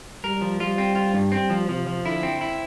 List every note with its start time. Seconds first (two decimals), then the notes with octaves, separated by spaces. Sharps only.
0.24 G3 A#4
0.41 F3
0.60 G3 F4
0.78 C4
0.95 F4
1.14 G2
1.32 C4
1.50 F3
1.69 C3 F3
1.87 F3
2.05 D3 E4
2.23 C4
2.41 E4